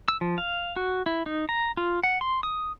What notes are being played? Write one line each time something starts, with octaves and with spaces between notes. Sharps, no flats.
E6
F3
F5
F#4
E4
D#4
A#5
F4
F#5
C6
D#6